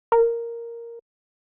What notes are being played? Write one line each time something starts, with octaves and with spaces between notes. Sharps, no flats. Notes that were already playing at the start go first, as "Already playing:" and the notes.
A#4